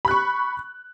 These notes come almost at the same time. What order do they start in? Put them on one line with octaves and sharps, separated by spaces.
B5 F#6 C#6